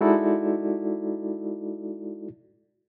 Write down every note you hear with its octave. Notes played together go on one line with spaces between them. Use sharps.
G#3 D#4 E4 F#4 A4 D5